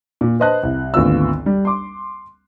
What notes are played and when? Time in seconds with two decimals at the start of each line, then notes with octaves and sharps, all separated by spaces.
0.21 A#2
0.40 B4 C5 D#5 A5 F#6
0.63 C2
0.94 G#1 D2 B3 F4 E6
1.46 G3
1.65 C6 D6